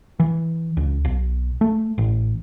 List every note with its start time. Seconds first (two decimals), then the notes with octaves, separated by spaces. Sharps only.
0.20 E3
0.77 C#2
1.05 B1
1.61 A3
1.98 A1